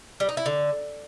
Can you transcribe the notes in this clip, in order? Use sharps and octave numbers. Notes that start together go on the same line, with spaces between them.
G3
D#4
E4
D3